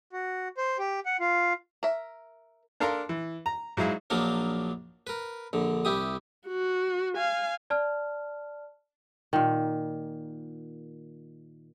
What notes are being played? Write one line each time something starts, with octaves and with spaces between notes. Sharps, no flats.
F#4
C5
G4
F#5
F4
A#4 E5
D4 A4 A#4 F5 A#5 C6
E3
A#5
G#2 F#3 E4 G#4 F5
A#1 F3 F#3 A#3 D4 A#4
A#4 B4
A#1 D3
C2 E4 G4 D#6
F#4
F5 G#5
D5 A5 F6
A#2 D#3